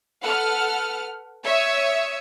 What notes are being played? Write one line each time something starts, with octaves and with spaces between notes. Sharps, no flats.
A4 B4 F#5 F6
C#5 E5 D#6 E6